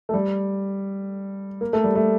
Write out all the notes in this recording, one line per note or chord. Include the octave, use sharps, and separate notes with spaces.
A3
G3
A#3
A3
G3
A3